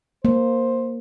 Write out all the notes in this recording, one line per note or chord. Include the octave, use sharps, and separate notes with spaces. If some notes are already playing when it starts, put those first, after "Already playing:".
A#3 C5